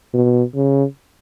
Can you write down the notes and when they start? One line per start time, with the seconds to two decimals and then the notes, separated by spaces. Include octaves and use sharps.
0.14 B2
0.55 C#3